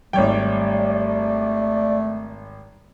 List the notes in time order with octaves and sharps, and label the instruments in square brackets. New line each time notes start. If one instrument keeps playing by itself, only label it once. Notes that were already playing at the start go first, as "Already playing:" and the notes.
[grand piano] G#1 C#5 G5 [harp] G3 [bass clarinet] A3 [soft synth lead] D5